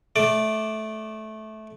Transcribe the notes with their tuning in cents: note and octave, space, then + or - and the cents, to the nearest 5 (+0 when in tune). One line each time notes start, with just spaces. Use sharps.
A3 -15 D5 +0